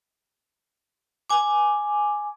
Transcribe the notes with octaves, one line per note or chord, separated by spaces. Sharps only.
G#5 D6